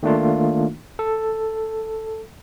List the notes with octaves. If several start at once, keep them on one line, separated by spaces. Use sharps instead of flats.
D#3 A3 A#3 D4 D#4 F4
A4